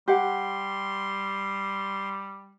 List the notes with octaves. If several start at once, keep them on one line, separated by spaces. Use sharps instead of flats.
G3 G4 F#5 C6